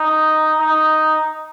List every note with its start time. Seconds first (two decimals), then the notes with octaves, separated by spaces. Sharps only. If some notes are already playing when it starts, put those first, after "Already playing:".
Already playing: D#4
0.59 D#4